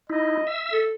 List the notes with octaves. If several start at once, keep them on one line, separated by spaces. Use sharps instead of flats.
D#4 E4 D#5
E5 E6
A4